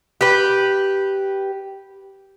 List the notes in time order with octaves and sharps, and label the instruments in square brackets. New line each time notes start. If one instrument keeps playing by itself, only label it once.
[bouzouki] G4 B4